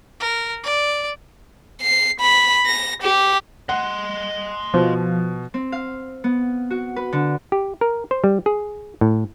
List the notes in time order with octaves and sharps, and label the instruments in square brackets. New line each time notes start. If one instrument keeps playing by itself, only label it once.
[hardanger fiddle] A#4
D5
[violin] C7
B5
A#6
G4
[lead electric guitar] D#5 C6 [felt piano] F#5
[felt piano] B2 [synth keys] F3
[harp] C4
F5
B3
F#4
B4
D3
[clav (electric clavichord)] G4
A#4
C5
G3
G#4
A2